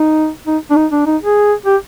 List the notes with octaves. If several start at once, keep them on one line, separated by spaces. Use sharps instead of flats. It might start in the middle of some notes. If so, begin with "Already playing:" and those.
Already playing: D#4
D#4
D4
D#4
D4
D#4
G#4
G4